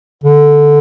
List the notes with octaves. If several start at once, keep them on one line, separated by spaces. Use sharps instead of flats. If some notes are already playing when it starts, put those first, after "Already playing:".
D3